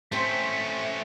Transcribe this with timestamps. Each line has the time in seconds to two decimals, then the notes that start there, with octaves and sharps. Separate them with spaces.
0.12 A3 C4 C#4 C5 B6
0.83 E5